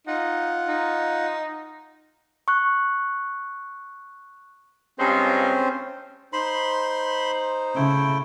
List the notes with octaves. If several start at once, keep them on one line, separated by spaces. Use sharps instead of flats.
D#4 F4 F#5
D#4
C#6 F#6
G2 G#3 C4 C#4 F4 C5
D#4 C5 B5 C6
C#3 A3 E4 G5